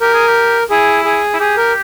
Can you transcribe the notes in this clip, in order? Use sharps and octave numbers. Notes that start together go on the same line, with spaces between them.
G4 A#4
G#4
G4
E4 G#4
G#4
E4
G4 G#4
A#4